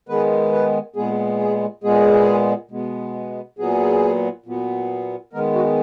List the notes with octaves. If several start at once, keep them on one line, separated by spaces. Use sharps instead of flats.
D#3 G#3 B3 B4
B4
A#2 G#3 B3 G#4
G#4
A#2 G#3 B3 G#4
B2 G#3 B3
A#2 F#3 B3 G#4
A#2 F#3 B3
D#3 G#3 B3 A#4
F#4